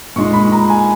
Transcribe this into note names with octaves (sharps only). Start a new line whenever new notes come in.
A#2 G#3 D#4 C#6
B5
A#5
G#5